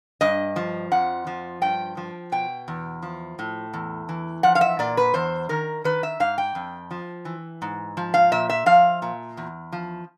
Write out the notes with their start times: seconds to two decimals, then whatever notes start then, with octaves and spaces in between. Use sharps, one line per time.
0.21 G2 D#5
0.56 F3
0.91 F2 F#5
1.27 F3
1.61 G2 G5
1.97 F3
2.32 B2 G5
2.68 E2
3.02 F3
3.39 A2
3.73 E2
4.09 E3
4.43 F3 F#5
4.55 F5
4.61 E5
4.79 A#2 D5
4.97 B4
5.14 E2 C5
5.49 D#3 A#4
5.84 D#3 B4
6.03 E5
6.20 G#2 F5
6.38 G5
6.55 F2
6.91 F3
7.25 E3
7.62 G#2
7.97 F3
8.14 F5
8.32 A#2 E5
8.49 E5
8.66 F3 F5
9.02 A#2
9.37 E2
9.72 F3